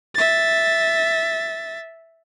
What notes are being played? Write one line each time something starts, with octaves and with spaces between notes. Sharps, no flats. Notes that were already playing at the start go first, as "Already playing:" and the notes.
E5 A6